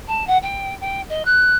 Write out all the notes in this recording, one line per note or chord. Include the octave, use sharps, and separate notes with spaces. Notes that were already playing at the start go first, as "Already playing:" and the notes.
A5
F#5
G5
G5
D#5
F#6